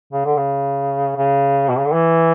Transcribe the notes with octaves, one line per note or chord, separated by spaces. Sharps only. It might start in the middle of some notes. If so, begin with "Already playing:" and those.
C#3
D3
C#3
C#3
B2
C#3
D3
E3